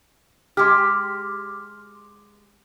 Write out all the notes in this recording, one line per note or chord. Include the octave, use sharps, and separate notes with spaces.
G#3 G4 C6 D6 F6